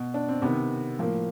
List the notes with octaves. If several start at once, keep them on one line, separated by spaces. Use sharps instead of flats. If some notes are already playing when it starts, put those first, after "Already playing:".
Already playing: B2
D4
C4
C3 D#3 B3
A2 F3 A#3